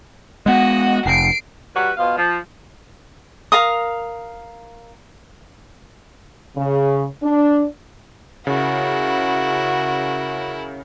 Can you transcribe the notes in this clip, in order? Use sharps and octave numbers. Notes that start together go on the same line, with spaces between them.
G#3 B3 F#4 D#5
F1 C7 D7
G3 F#4 B4
B2 F4 F5
F3
A#4 F5 A#5 D#6
C#3
D4
C#3 E4 F#4 A#4